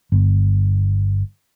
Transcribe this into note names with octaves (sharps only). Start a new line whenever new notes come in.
G1